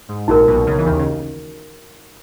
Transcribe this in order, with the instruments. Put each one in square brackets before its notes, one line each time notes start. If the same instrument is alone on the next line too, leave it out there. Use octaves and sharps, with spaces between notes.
[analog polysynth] G#2
[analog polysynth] A#1 A#2 [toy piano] D#4 F#4 A#4
[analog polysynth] B1 B2
C#2 C#3
E3
D#2 D#3
C#3